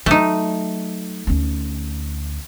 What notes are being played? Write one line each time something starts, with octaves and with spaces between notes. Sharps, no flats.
F#3 A3 D#4
D2 C#4